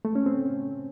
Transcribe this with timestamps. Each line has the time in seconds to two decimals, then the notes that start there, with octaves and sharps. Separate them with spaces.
0.05 A3
0.15 C#4
0.26 C4